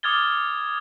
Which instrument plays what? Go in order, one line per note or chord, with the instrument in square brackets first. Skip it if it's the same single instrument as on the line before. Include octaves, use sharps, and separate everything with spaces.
[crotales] D6 D#6 F6 G#6 A6 G7